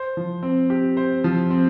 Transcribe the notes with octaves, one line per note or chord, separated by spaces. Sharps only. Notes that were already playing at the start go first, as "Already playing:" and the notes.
Already playing: C5
F3
C4
G4
C5
F3
C4